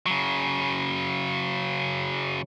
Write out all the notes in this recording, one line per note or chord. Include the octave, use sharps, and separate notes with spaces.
C#3 F#3